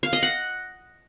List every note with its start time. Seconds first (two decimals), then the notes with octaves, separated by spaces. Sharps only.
0.03 F5
0.13 D#5
0.23 F#5